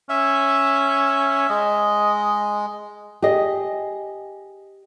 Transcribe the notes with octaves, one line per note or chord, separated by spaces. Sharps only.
C#4 E5
G#3 D#5
G4 G#4 D#5